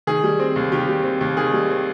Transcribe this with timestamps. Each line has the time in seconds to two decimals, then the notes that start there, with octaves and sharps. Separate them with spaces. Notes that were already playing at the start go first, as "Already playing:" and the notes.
0.07 D#3 G#4
0.23 G3
0.40 C4
0.56 D#2
0.72 D#3 G4
0.88 G3
1.04 C4
1.21 D#2
1.37 D#3 G#4
1.53 G3
1.70 C4